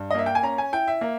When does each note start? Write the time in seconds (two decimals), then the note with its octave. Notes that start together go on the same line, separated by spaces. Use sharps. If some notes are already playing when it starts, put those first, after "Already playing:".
Already playing: G2
0.11 D#5
0.15 A#3 E5
0.26 G5
0.35 G#5
0.43 C#4 A#5
0.58 G#5
0.72 E4 G5
0.88 E5
1.01 A#3